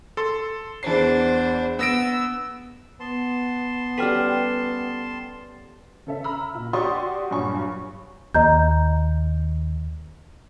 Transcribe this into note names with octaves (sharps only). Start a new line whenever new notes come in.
A4 C6
E2 E3 D4 C5 C7
B3 E6 A#6 D7
B3 A5 C6
G3 C#4 A4 B4 G5 F6
C#3 A4 E5
A#5 B5 E6 F6
A#2
F#4 G4 D5 C6 C#6 D#6
G2 A#2 F#3 G#5 C#6
D#2 D#5 A#5 G6